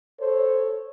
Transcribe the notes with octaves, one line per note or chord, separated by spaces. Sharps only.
A4 C5 C#5